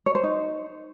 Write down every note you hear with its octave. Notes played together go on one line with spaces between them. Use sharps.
C#5
C5
D#4